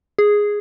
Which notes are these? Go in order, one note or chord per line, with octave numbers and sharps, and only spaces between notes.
G#4